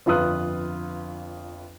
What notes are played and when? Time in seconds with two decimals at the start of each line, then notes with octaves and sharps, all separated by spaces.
0.06 G1 F2 F4 B4 D#6 F#6